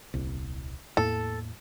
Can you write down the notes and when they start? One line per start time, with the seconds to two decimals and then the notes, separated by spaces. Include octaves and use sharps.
0.14 D#1 C2
0.97 E2 A2 A#3 A4